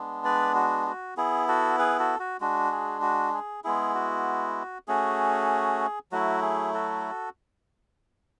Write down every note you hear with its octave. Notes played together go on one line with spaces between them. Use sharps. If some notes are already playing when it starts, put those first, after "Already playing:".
Already playing: G#3 B3 D4
B4 D5
F#4
F#4
B3 E4 G#4
F#4 A4
G#4 B4
F#4 A4
F#4
G#3 D4 F#4
G#4
F#4
G#4
G#3 B3 E4 G#4
F#4
A3 C#4 F#4 G#4
F#3 A3 E4 F#4
G#4
F#4 A4